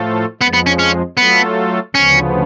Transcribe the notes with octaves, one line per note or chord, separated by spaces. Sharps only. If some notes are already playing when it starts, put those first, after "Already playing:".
Already playing: A2 F3 A3 F4 A4
F2 F3 G#3 B3
B3
C#4
C#4
F#3 A3 B3 F4 A4
D2 C#3 F3 B3 C#4